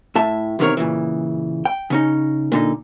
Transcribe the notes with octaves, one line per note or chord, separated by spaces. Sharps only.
A2 A3 E5 A5
E2 C3 D#3 A#4 C#5
A#2 C#3 E3
G5
C#3 C#4 D#4
A#2 D3 D#4